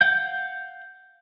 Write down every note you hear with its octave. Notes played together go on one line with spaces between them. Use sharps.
F5 F#5 G6